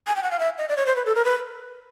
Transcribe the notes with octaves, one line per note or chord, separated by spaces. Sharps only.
G#5
G5
F#5
F5
E5
D#5
D5
C#5
C5
B4
A4
A#4
B4